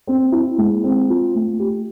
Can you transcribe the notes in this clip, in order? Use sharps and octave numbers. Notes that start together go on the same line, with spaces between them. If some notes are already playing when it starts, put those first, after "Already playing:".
C4
E4
G#3
C4
F4
A3
G4